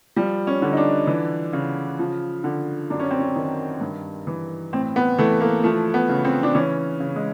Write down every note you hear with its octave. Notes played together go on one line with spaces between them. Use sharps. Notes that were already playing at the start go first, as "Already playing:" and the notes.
F3 G3
C#4
D3
D#4
D4
E3
C#3
F3
D3
F#2 D4
C#4
C4
C#4
D#3
G2
E3
A2 C4
B3
E3 A3
A#3
F3 A3
B3
C#3
C4
D4
E3 C#4
C#3
G#3